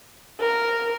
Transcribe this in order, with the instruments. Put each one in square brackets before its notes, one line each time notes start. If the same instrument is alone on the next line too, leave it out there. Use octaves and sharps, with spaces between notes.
[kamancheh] A#4